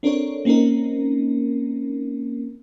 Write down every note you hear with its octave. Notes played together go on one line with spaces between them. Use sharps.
C4 D4 A4 A#4 C#5
A#3 C4 C#4 D#4 A#4